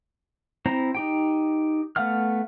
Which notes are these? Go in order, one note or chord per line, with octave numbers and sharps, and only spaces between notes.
C4 E4 C5 A#5
D#4 G4 G5
A3 B3 F5 F#5 F6